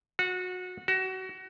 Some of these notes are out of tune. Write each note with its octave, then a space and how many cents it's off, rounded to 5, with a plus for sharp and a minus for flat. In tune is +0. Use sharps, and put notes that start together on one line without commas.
F#4 -25
F#4 +25